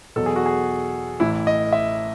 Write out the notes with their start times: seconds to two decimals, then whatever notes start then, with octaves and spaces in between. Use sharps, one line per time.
0.16 E2 B2 F#3 A4
0.26 G#4
0.36 F#4
0.46 G#4
1.20 A1 A2 E3 E4
1.47 D#5
1.72 E5